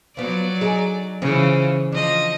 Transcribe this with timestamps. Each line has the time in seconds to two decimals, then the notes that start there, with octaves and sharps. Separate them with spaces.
0.17 F3 F#3 B3 D5
0.61 D#4 G#4
1.22 C#3 E3 F3
1.92 F3 D4 D#5